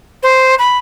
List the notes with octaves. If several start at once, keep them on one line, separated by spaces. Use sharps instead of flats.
C5
B5